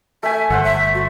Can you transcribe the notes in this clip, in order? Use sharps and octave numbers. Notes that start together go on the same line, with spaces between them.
A3 E5 G#5
G1 A4 C5 F#5
E5
F#4